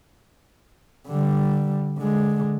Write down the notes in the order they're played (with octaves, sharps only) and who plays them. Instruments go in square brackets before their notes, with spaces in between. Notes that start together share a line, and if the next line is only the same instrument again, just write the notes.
[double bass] D3 G3
D3 G#3